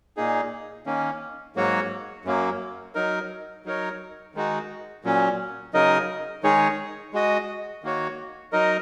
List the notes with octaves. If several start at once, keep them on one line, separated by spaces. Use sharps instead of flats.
A#2 A#3 D#4 G#4
D#3 A#3 C#4
G#2 F#3 A#3 F#4 C#5
F#2 F#3 A#3
F#3 D#4 A#4
F#3 D#4 A#4 C#5
D#3 G#3 D#4 F#4
A#2 F#3 C#4
C#3 F#3 D#4 A#4 D#5
D#3 G#3 D#4 G#4 C#5
G#3 F#4 D#5
D#3 A#3 F#4 C#5
F#3 D#4 A#4 D#5